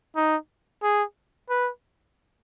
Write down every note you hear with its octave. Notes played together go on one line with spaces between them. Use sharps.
D#4
G#4
B4